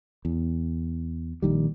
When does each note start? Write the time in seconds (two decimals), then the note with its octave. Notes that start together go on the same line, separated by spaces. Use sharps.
0.25 E2
1.42 A#1 D#3 G3